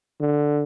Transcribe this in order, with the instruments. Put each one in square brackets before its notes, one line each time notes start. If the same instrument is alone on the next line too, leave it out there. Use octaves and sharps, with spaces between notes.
[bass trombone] D3